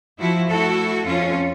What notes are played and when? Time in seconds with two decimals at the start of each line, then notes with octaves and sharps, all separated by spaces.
0.19 F3 E4 F#4
0.50 A3 E4 F#4 A4
1.05 F2 C#4 F4